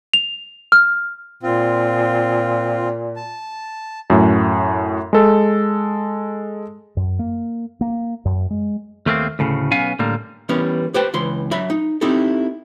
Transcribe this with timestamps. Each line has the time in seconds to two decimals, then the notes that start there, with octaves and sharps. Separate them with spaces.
0.13 F7
0.72 F6
1.43 A#2 C4 F4
3.16 A5
4.10 F#2 A2
5.13 G#3 A4
6.97 F#2
7.19 A#3
7.81 A#3
8.25 F#2
8.50 G#3
9.06 D#2 A3 A#3 C4
9.39 D2 A2 C#3
9.72 B1 B3 C#4 F5 G#5
9.99 A2 D3 G3 A#3
10.49 E3 G3 B3 C#4 A#4
10.94 G4 B4 C5 G5 A5
11.14 C#2 E3 C6
11.51 F#3 E5 B5
11.70 D#4
12.01 C4 D#4 E4 G4 A4